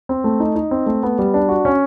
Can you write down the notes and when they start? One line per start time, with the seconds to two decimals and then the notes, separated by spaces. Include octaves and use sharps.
0.09 C4
0.24 A3
0.40 D#4
0.55 D#4
0.71 C4
0.86 A3
1.03 B3
1.19 G3
1.34 D4
1.49 F#4
1.65 C#4